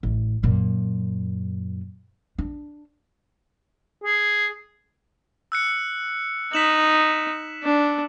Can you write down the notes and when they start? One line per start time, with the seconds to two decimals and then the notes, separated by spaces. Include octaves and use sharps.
0.03 A1
0.43 F#2 A#2
2.38 D4
4.04 G#4
5.52 E6 F#6 C#7
6.53 D#4 B6 E7 F#7
7.64 D4